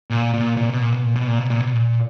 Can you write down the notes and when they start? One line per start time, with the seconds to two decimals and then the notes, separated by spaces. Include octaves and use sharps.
0.10 A#2
0.34 A#2
0.57 A#2
0.69 B2
0.81 A#2
0.92 B2
1.03 A#2
1.16 B2
1.27 A#2
1.39 B2
1.50 A#2
1.61 B2
1.73 A#2